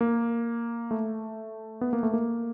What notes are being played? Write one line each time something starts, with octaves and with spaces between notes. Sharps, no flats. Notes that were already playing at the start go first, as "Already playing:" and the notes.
A#3
A3
B3
A#3
A3
A#3